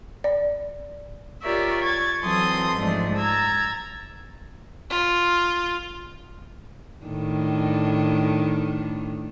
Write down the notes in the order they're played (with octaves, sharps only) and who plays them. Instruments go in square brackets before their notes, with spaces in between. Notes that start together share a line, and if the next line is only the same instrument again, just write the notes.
[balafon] D5
[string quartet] F4 G4 A#4 C#5 D5 E5
C#6 G#6 A6
E3 F#3 C4 A4 C6 D#6
G#2 F3 A3 D4
A#5 E6 G#6 A6
[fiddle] F4
[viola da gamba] A2 D#3 D4